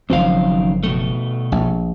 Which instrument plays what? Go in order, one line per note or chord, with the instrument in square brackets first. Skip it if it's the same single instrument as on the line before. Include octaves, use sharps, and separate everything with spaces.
[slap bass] F#1 F3 C4 [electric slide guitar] F#2 D#3 F5
[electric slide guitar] B2 A3
[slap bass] A#1